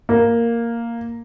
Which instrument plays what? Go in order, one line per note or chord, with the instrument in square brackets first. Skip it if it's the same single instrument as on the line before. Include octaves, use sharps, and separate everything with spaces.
[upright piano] A#3